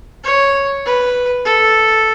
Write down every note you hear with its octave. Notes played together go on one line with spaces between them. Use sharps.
C#5
B4
A4